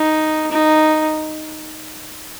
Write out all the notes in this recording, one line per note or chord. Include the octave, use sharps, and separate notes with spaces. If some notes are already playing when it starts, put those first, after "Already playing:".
Already playing: D#4
D#4